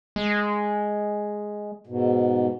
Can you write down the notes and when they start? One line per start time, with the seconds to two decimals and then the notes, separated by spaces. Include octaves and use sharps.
0.16 G#3
1.87 G#2 B2